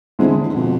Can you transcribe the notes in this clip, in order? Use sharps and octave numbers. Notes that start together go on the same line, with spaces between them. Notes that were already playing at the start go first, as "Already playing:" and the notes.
F2 D3 G#3 C4 E4
E2
E2
G#2
F2 B2